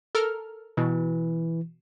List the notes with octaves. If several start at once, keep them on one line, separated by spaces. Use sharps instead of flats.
A4 A#4 F6
B2 E3